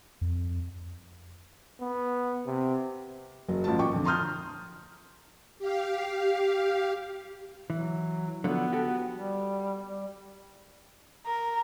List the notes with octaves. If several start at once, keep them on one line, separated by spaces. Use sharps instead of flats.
F2
B3
C3
F#1 F#3
A1 F3 A5
A#2 G5 C#6 D6
F2 D3
A5 A#5 C6 D#6 F6 G6
G4 F5
E3 F#3
D3 F3 F#3 B3
F#4 G4 A4
G3
G3
A#4